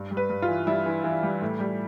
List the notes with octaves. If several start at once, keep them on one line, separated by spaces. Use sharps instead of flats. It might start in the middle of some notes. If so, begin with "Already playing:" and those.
Already playing: G2
G3
B4
G2
F4
E3
G3 E4
E3
E3
G3
A2
G3